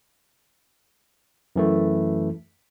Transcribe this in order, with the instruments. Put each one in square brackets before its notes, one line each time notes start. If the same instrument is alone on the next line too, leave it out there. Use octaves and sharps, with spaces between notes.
[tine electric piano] F#2 E3 A3